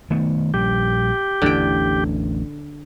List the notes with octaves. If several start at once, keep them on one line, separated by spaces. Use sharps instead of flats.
D#3 A3 B3
A#1 G3 G4
A1 E2 D3 G5